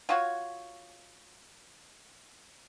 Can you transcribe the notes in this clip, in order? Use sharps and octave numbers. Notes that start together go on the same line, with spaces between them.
F4 F#4 C#5